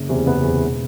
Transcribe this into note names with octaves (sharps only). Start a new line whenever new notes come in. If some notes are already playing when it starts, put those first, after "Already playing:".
Already playing: F#1
E2 C3
F#1 B3
E2 C3
E1